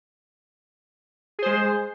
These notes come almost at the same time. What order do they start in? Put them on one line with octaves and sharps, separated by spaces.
G#4 C5 G#3